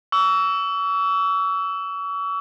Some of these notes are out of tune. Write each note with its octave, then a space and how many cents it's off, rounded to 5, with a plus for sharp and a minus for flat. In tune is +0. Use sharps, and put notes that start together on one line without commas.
C#6 +40 E6 +0